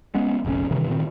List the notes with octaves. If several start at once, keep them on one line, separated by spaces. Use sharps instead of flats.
G#3 B3 C#4
F1 A#1 F2 C#4
G2 C3 D#3 E3
A#2 D#3 C4